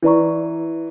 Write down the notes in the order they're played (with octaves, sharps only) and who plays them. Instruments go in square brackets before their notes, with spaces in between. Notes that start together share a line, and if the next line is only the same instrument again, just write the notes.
[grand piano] E3 [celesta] E4 B4 D5 A#5 C#6